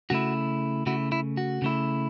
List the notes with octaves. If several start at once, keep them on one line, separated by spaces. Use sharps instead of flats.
C#3 A3 E4 F#4
C#3 A3 E4 F#4
E4
F#4
C#3 A3 E4